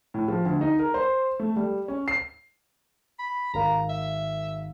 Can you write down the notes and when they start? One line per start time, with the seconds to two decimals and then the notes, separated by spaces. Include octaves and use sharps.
0.14 A2
0.28 F3
0.45 D2
0.61 D#4
0.79 A#4
0.94 C5
1.39 A3
1.56 G3
1.88 C#4
2.08 C7
3.19 B5
3.54 G#1 A#4 F5 A#5
3.89 E5